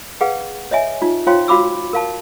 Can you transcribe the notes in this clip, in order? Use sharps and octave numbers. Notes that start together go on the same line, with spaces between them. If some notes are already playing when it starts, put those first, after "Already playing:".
G#4 B4 F5 F#5
C#5 D#5 E5 G#5
D#4 F4
F4 C5 C#5 F5 G5 C6
F#4 F5 B5 D6 E6
A#4 F5 A5